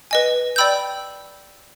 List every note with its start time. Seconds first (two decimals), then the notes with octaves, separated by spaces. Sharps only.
0.11 B4 D#5 G#5
0.56 D5 G5 B5 E6 G6